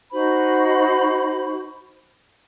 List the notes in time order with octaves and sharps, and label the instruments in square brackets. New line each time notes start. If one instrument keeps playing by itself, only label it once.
[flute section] D#4 F#4 C5 B5